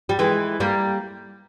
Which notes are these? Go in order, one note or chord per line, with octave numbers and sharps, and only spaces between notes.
G3
E3 G#3
G3 A#3